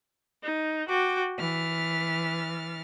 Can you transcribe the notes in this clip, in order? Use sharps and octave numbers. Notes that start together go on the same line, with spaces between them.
D#4
F#4 G5 D6
E3 F6 A6